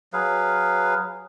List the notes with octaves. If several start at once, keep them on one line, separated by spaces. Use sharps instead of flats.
F#3 G#4 B4 F5